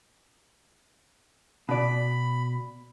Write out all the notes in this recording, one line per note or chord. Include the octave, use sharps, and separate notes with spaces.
B2 D5 B5